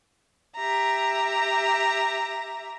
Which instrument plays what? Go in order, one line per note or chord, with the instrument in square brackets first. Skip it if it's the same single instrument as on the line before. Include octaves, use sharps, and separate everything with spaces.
[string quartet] G4 E5 A#5